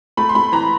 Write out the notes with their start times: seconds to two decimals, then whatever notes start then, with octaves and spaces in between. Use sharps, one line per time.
0.17 A3 B5
0.29 C6
0.35 A3 B5
0.52 E3 A#5